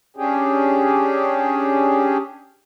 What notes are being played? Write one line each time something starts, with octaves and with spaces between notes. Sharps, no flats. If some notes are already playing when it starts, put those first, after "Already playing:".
C#4 D4 G4 G#4